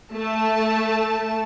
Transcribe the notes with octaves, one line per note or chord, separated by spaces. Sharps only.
A3 A5